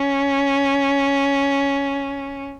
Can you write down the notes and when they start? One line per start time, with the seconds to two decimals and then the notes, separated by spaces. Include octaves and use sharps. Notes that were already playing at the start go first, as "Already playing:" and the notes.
Already playing: C#4